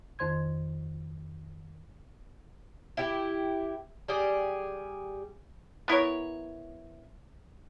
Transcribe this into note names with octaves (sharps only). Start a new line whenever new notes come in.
F2 D#3 C5 C6 G#6
E4 G4
G3 G4 G#4
B3 E4 A#4 C#5